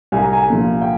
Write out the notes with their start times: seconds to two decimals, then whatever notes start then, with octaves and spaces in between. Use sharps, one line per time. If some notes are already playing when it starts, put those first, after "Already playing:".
0.12 C2 G#5
0.22 A#5
0.33 G#5
0.50 A#2 F3
0.81 G5